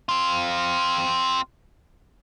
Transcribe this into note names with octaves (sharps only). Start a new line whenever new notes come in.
C4 F4